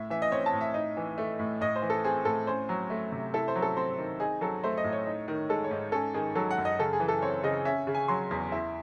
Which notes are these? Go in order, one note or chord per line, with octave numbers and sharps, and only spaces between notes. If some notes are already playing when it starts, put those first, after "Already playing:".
Already playing: A2 E5
E3 E5
D#5
C4 C#5
A5
A2
E5
D#4
E3
A3
A2
A2 D#5
C5
E3
A4
C4 G#4
A2 A4
C#4 C5
F#3
A3
C3
E4 A4
C5
F#3
A4
C4 C5
D#3
D#4 G#4
F#3 A4
A3 C5
D#5
A2
C#5
D#4
D#3
G#3 A4
C#5
G#2
C#4 A4
D#3 G#4
F#3 A4
F#5
F#2
D#5
C#3 A4
G#4
E3
A4
C4 C#5
C#3 D#5
C#4 E5
C#3
G#5
F#3 C6
E2
E4